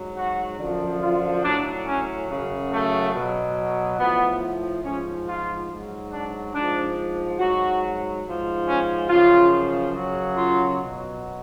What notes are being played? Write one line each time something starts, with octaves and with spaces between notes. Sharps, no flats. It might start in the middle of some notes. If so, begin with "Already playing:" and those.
Already playing: G#2 F#3
F#4
F#2 D3 F3
F4
A2 F#3 D4
C#4
F#2 C#3 F#3
A3
B2 F#3
A2 F3 B3
G#2 F3 C#4
F4
G#2 F#3
D4
G#2 F3 D4
G#2 F#3 F#4
G#2 F3
C#4
F#2 C#3 F3 F4
F#2 C#3 F#3
F4
B2 F#3